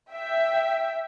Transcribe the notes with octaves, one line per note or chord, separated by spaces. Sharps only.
E5 G5